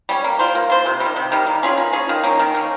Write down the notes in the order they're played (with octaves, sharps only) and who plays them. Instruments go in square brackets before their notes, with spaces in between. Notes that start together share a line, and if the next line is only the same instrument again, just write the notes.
[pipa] G3 C#4
A#3
F4 C5
A#3
F4 C5
C3
D#3 G3
C3
D#3 G3
A#3
C#4 F4 G#4
A#3
C#4 F4 G#4
D#3
A#3 C#4
D#3
A#3 C#4